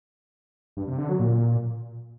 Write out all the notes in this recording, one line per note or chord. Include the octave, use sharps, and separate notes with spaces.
G2
C3
D3
F#3
A#2